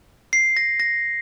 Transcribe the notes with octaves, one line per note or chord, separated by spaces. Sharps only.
C7
A#6
A#6